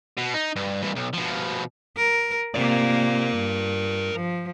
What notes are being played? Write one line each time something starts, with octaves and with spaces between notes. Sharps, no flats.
B2
D#4
G2
G2 E3
B1
B2 F3
A#4
C3 A#3 A#4 D5
G2
F3